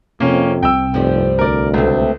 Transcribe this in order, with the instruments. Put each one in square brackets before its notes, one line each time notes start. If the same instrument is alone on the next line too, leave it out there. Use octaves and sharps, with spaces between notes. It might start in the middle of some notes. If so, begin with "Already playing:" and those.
[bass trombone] F2 [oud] C3 [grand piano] A#3 C#4
[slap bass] C2 [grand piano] G5 E6
[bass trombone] F1 [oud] G2 F3 G3
[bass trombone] D2 [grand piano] A#4 D5
[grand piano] C#2 [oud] A3 C4